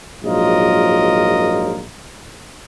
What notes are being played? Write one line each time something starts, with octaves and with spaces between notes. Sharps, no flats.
A#1 G#2 F#3 F4 A#4 D#5